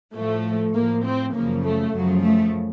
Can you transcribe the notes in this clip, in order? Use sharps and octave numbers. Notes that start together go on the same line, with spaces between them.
A2 F3 A3
A2 F3 A#3
C4
F#2 C#3 F3 A#3
A3
F#2 C#3 F3 F#3
A3